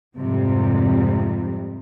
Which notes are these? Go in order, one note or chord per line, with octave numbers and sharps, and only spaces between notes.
F2 G#2 C3 G3